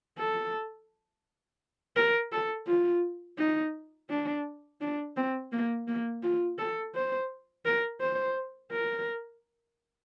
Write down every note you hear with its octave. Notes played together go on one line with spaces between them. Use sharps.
A4
A#4
A4
F4
D#4
D4
D4
C4
A#3
A#3
F4
A4
C5
A#4
C5
A#4